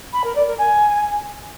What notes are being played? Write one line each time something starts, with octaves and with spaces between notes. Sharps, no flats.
B5
A#4
D5
A#4
G#5